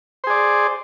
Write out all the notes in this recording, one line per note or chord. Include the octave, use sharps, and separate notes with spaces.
G#4 C5 D5